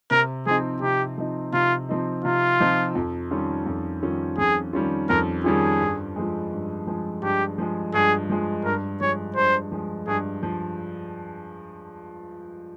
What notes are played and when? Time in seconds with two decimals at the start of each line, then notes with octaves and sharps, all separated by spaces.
0.11 C3 A#4
0.46 F3 C4 D#4 G#4
0.82 C3 G4
1.18 F3 C4 D#4
1.53 C3 F4
1.89 F3 C4 D#4
2.24 C3 F4
2.60 F3 C4 D#4
2.95 F2
3.31 D#3 G3 C#4 F4
3.66 F2
4.03 D#3 G3 C#4 F4
4.38 F2 G#4
4.73 D#3 G3 C#4 F4
5.09 F2 A#4
5.44 D#3 G3 C#4 F4 G#4
5.81 G2
6.16 F3 G#3
6.51 G2
6.87 F3 G#3
7.23 G2 G4
7.58 F3 G#3
7.94 G2 G#4
8.29 F3 G#3
8.64 G2 A#4
9.01 F3 G#3 C#5
9.36 G2 C5
9.72 F3 G#3
10.07 G2 G#4
10.43 F3